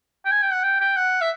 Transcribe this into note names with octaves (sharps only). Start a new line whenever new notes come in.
G5
G#5
G5
F#5
G5
G5
F#5
E5